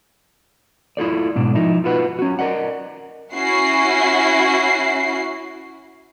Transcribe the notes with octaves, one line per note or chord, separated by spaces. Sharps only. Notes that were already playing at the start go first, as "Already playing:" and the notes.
E4 F4 A4 D5
G#2 B2 D4
F3 D#4 E4
F4 F#4 B4 F#5
C#4 F#4
A#4 D5 D#5 F#5
C#4 E4 F#4 C7